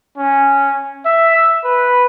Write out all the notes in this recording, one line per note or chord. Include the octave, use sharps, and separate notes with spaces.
C#4
E5
B4